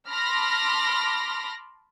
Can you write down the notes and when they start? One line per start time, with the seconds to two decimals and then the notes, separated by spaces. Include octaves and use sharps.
0.10 A5 B5 C6 D6 F6 A#6